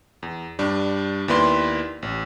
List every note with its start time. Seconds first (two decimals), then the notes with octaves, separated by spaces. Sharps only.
0.23 E2
0.59 G2 G3 D4
1.28 D#2 B3 E4 B4 D5 C6
2.02 A1